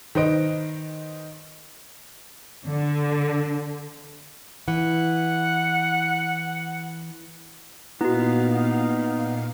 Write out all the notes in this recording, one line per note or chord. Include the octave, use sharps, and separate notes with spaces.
D#3 D#4 B4 C5 D#5 D7
D3
E3 F#5
A#2 B3 D#4 E4 F#4 F5